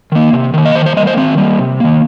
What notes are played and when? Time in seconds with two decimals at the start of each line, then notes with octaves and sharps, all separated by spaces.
0.12 D#3 A#3
0.33 C3
0.54 D#3 A#3
0.65 D#5
0.75 D#3 C5
0.86 C5
0.97 G3 A#3 D#5
1.07 C5
1.17 D#3 C4
1.38 G3 A#3
1.59 C3
1.80 D#3 A#3